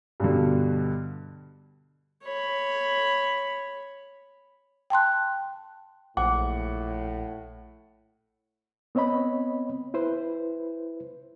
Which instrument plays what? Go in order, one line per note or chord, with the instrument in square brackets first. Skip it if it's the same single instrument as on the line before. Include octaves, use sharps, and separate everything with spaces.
[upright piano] G2 B2 D3
[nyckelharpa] C#5 B5
[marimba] G5 A5 C6 F#6
[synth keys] A#1 [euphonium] A2 [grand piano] F#5 [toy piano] D6
[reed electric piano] B3 C4 C#5 D#5 B5
E4 B4 C5